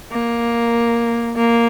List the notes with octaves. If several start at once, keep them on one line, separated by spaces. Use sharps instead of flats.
A#3
A#3